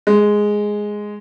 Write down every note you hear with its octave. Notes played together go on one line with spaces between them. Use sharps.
G#3